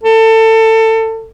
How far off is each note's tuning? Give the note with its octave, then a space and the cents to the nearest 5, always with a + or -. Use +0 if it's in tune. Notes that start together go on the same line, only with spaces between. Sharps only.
A4 +25